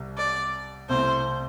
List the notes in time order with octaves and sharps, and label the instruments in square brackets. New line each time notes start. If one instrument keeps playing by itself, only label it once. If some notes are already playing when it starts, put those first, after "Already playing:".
Already playing: [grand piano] C2 C3 G3
[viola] D5
[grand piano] C2 C3 A3 E4 [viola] C5